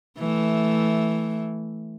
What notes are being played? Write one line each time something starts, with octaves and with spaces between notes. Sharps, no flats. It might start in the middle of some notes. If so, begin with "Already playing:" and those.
E3 A3